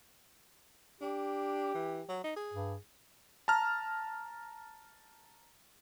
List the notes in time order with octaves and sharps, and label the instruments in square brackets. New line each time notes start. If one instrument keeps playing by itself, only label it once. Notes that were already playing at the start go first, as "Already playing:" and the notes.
[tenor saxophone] D4 [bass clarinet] G4
[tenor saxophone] E3
F#3
D#4
G#4
[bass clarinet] G2
[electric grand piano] A5 A#5 F6